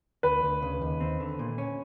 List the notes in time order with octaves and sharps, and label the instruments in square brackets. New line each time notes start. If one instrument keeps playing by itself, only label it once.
[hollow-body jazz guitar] D2 [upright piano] B4
[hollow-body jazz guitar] D2
C#3
D#2
C4
D3
A#2
C#4